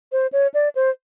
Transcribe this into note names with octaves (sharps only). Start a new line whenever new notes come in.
C5
C#5
D5
C5